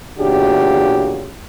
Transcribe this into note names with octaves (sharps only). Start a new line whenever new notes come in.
E2 A#2 C#3 D4 F#4 G4